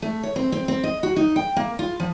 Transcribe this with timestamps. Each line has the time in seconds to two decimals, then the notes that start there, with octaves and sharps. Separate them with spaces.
0.02 A3
0.23 C#5
0.36 C4
0.52 C4
0.68 C4
0.83 D#5
1.03 F#4
1.16 D#4
1.36 G5
1.56 A#3
1.79 F4
2.00 F3